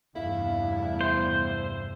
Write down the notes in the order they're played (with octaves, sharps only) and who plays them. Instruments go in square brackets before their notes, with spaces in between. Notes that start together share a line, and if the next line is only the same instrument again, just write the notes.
[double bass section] F1 E2 G2 [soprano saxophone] E4 [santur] F5
[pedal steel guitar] C5 [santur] E5